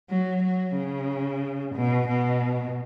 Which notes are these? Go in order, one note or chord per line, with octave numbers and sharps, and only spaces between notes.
F#3
F#3
C#3
B2
B2